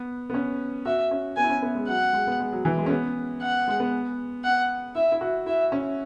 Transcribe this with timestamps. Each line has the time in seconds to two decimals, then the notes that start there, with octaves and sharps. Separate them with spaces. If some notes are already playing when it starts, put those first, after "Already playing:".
Already playing: B3
0.30 B3
0.34 C#4
0.86 F#4 E5
1.11 C#4
1.37 B3 G#5
1.44 E4
1.50 C#4
1.62 B3
1.75 G#3
1.87 F#3 F#5
2.13 G#3
2.27 B3
2.39 G#3
2.52 F#3
2.65 E3
2.77 G#3
2.86 C#4
2.90 B3
3.42 F#5
3.68 G#3
3.80 B3
4.44 F#5
4.95 E4 E5
5.12 E4
5.21 F#4
5.46 E4 E5
5.72 C#4